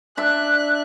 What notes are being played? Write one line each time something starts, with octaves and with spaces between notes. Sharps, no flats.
D4 E5 F#6